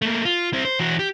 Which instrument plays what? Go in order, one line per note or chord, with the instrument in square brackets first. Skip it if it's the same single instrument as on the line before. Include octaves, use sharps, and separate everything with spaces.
[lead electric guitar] A3 A#3
F4
C4 E4
C5
E3 F#4
G4